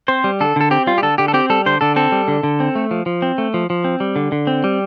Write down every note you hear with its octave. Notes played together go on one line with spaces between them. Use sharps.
C4 C5
G3
D3 A4
D3 A4
C4 G4
G3 F4
G4
D3 A4
D3 G4
A4
C4 G4
G3 A4
D3 C5
D3 A4
C4 A4
G3
D3
D3
C4
A3
F3
F3
C4
A3
F3
F3
C4
G3
D3
D3
C4
G3